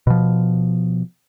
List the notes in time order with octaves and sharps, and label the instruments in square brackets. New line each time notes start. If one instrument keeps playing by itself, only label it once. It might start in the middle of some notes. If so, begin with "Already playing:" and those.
[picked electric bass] B2 F3